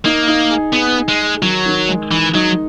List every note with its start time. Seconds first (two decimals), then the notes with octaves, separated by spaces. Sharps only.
0.05 A#3 D#4
0.28 D#4
0.51 G#4
0.73 B3 G#4
0.97 G#4
1.09 G#3
1.20 G#4
1.43 D#3 F#3
1.66 D#3
1.89 G#3
2.11 E3 D#4
2.35 F#3 D#4